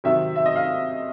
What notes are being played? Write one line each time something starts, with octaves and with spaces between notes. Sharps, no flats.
C3 D#3 F#3 E5
E5
D#5
F5